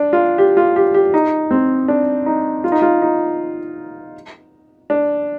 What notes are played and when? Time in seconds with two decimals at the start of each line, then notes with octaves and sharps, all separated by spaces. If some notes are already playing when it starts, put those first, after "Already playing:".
Already playing: D4
0.13 F4
0.38 G4
0.57 F4
0.76 G4
0.94 G4
1.14 D#4
1.51 C4
1.88 D4
2.26 D#4
2.64 F4
2.72 D#4
2.82 F4
3.02 D#4
4.90 D4